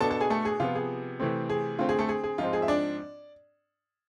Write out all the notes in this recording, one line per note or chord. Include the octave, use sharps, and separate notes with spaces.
B2 B3 D4 A4 A5
A4 A5
G#4 G#5
A3 A4
G#4
C3 F3 B3 F4
G#4
C3 E3 A3 C4
G#4
D3 A3 C4 F4
G#4
A3 A4
G#4
G#4
G#2 F3 G#3 C4 F4
G#4
E5
D4 D5